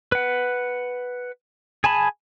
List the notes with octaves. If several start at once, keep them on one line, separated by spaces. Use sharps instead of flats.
B4 F#5
G#4 G#5 A5 B5